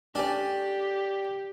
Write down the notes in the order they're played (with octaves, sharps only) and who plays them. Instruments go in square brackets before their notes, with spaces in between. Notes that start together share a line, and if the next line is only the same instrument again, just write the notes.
[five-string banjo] A3 C#4 D5 [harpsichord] D4 [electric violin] G4 [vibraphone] G5